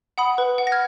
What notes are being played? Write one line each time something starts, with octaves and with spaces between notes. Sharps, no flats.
F#5 B5 D#6
B4
F#5
A#6
F6 G#6